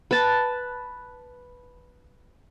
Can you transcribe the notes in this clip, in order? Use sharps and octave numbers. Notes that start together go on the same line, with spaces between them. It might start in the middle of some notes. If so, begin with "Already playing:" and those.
B4 A5